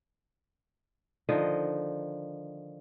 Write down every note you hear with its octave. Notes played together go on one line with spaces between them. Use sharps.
D3 D#3 F3 D#5